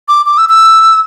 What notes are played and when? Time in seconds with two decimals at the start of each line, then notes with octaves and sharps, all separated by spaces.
0.08 D6
0.26 D6
0.38 E6
0.49 E6